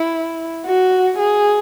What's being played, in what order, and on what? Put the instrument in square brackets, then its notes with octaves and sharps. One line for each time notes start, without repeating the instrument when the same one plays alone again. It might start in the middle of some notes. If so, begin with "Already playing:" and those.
Already playing: [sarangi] E4
F#4
G#4